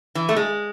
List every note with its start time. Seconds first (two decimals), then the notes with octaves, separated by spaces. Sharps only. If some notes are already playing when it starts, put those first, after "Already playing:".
0.15 E3
0.29 A3
0.36 G#3